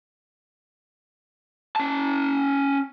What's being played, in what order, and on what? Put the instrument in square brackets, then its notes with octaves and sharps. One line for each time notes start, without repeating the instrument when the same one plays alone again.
[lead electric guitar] C#4 A5